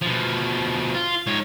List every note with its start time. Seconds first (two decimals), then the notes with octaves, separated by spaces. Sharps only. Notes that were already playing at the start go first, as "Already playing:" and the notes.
0.01 B2 F3
0.95 F4
1.27 G#2 C#5